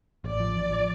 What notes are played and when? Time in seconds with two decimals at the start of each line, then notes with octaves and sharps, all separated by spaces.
0.24 A1 D5
0.40 F3
0.57 A1
0.72 F3